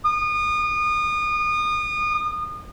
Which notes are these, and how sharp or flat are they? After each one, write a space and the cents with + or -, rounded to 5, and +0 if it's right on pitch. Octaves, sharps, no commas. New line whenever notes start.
D#6 -30